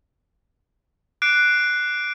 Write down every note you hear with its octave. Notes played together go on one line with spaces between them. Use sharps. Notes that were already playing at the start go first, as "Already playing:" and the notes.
D6 F#6 C7 D7